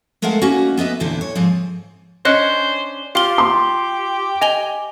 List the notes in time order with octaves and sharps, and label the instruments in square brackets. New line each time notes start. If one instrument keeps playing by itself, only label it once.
[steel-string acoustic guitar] G#3 A3 A#4 C5 F5 F#5
A#3 C#4 D#4 F#4
B3 B4 D#5 E5
E2 A#2 D3 E4 C5
C#5
G#2 F3 C4
[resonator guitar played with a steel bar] C#4 D4 C#5 [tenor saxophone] C5 [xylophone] D#5 F#6
[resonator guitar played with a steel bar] F4 [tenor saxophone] G4 [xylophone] F5 G7
[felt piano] C6
[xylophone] D#5 F7 G7 [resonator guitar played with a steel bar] G#5